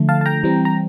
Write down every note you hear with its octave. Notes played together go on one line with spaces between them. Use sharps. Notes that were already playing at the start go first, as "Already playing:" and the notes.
Already playing: D3 F3 A3
F5 A5
A5
G5 A#5
E3 G3 C4
A#5